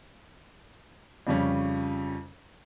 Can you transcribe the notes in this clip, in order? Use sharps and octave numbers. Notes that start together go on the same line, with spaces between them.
F2 C#3 G3 C#4